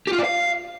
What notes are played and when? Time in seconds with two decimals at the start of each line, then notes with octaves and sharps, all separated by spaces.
0.07 G4
0.13 F4
0.18 D5
0.24 F5